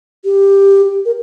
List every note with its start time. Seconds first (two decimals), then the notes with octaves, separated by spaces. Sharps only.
0.25 G4
1.05 A#4